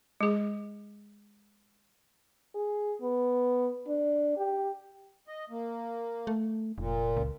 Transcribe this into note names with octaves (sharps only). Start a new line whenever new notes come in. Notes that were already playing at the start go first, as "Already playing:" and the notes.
G#3 G#4
G#4
B3
D4
G4
D#5
A#3
A3
F1 A#2
C#2